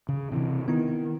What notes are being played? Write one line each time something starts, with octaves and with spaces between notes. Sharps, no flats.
C#3
C3 D#3 E3
D#3 B3 E4